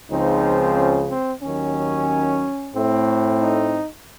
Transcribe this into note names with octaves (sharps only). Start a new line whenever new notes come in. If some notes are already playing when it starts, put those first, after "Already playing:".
C#2 C#3 F3 C4 D#4
C#4
C4
D#2 D#3 F#3 C#4
A2 A3 C4
D#4